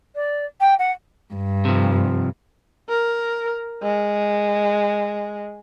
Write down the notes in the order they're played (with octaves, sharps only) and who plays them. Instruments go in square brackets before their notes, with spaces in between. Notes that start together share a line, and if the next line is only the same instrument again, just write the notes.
[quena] D5
G5
F#5
[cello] G2
[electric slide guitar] C3 F3
[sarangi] A#4
G#3